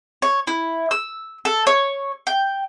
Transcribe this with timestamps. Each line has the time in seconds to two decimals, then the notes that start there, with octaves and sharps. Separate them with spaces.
0.22 C#5
0.47 E4
0.91 E6
1.45 A4
1.67 C#5
2.27 G5